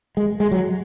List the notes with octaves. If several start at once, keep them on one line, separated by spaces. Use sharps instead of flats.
G#3
G#3
F#3